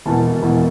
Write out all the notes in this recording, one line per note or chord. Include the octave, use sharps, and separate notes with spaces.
E1 E2 B2 A5
E1 E2 B2